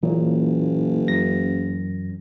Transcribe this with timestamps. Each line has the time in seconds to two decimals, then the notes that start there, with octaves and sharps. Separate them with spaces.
0.03 F#1 A#2 E3 C#4
1.08 F#2 A#6